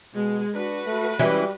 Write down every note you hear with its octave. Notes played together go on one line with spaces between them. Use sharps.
B2 G#3
D4 F#4 B4
A3
E3 G3 G#3 C#4